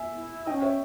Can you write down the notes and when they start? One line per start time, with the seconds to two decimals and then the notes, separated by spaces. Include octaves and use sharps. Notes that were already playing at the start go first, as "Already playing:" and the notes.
Already playing: E5 G#5
0.15 E4
0.46 D#4 D#5 G5
0.51 C#4
0.57 G5
0.62 C#5 E5